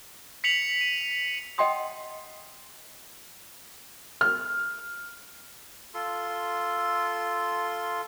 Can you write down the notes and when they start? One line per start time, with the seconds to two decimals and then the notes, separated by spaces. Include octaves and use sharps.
0.44 B6 C#7 F7 F#7
0.81 D#7
1.58 D#5 F#5 G5 C6 D#6
4.21 F6
5.94 F4 A4 C6